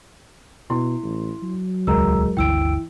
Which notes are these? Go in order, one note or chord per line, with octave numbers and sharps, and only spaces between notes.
B2 E4 C6
A1
F#3
D#1 C#2 G#3 A#4 A#5 E6
G1 D2 E3 G5 E6 D7